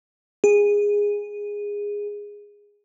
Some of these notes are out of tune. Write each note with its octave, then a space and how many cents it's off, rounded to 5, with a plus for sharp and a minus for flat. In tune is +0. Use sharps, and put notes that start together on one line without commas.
G#4 -15